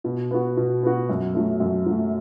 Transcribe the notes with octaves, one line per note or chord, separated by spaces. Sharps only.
B2
B3 F#4
B2
B3 F#4
F#2
F#3 A3
F#2
F#3 A3